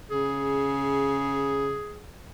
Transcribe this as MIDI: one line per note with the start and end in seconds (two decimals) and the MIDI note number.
0.10 1.76 49
0.10 2.02 68